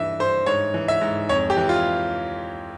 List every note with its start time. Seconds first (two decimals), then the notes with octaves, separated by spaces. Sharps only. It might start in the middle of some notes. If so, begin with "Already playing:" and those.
Already playing: G2 E3 E5
0.20 G2 C5
0.46 G#2 C#5
0.74 E3
0.88 E5
1.01 G#2
1.29 F2 C#5
1.50 G4
1.57 E3
1.69 F4